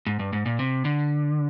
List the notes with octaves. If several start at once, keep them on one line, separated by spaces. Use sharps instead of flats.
G#2
G2
G#2
A#2
C3
D3